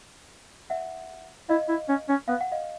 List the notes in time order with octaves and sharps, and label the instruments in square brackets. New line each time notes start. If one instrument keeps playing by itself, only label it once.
[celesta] E5 F#5
[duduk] E4 [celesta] D#5 F5
[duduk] E4
C#4
C#4
[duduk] B3 [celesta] F5
[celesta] F#5
D#5 F5